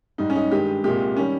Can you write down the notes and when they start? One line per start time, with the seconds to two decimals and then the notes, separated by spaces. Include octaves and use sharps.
0.18 G#2 G3 D#4
0.30 C#4
0.36 D#4
0.51 G2 D#3 G#3 G4
0.84 C2 A#2 G#3 G4
1.17 D#3 G3 C#4